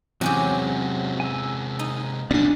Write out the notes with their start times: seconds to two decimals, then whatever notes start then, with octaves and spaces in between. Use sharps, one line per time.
0.21 E2 C3 F#3 G#3 C4 C#4 G4
1.20 G#5 E6
1.79 D#4
2.31 B2 G3 C4 D4 D5 G#5